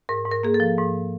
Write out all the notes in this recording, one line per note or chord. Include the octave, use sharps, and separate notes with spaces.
G#2 A#4
G#2
A#4
A#3 G#4
A4
F3
G#2